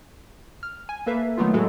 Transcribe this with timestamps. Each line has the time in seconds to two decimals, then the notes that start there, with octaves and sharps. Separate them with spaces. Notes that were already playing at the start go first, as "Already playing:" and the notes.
0.63 F6
0.89 G#5
1.06 A#3 A4 B4 E5 F5
1.38 D#3 F#3 A3 B3 D#4 F4
1.54 A2 F#3 G#3 F#4 A4